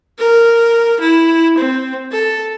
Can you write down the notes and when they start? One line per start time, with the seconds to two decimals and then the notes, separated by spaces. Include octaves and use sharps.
0.19 A#4
1.00 E4
1.58 C4
2.12 A4